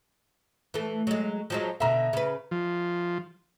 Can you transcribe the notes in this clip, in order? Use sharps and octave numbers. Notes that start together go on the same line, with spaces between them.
E3 A3
F#3 G#3
F3 F#3 G#3
B2 D3 E5 A#5
C#3 B4
F3